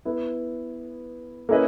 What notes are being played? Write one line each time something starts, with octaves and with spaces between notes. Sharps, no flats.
B3 E4 B4
A#3 C#4 E4 B4 D#5